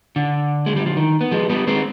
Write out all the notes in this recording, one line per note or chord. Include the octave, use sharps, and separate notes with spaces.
D3
G#3
G3
F3
D#3
B3
F3 G#3
G3 B3
G#3 C4